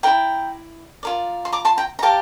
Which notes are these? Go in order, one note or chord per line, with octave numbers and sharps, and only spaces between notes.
E4 A#4 D5 G5 A#5
F4 A#4 D5
C6
A#5 D6
A5 C6
G5 A#5
A#5
G4 A#4 D5 F5 A5